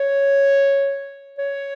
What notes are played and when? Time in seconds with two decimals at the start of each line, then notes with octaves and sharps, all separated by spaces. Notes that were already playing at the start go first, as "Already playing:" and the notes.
Already playing: C#5
1.38 C#5